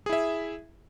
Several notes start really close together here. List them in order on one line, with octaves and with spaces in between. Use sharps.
G#4 E4 E5